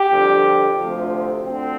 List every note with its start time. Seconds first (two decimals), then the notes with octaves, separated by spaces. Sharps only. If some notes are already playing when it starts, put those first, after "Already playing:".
Already playing: G4
0.11 F2 D3 G3
0.79 D2 C3 F3
1.46 D2 D3 C4